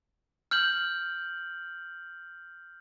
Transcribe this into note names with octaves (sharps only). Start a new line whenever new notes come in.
F6 G6 F#7